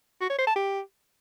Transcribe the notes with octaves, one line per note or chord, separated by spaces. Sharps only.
F#4
C#5
C5
A5
G4